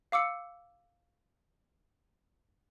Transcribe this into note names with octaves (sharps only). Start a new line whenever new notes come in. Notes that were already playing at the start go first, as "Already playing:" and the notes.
F5 D6 E6 C#7